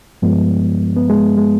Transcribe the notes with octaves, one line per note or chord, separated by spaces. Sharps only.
G2 F3 G#3 B3
B3
G#3
G#3